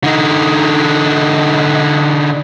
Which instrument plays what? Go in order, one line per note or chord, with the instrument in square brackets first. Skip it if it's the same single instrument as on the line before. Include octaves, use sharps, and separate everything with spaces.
[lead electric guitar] D3 D#4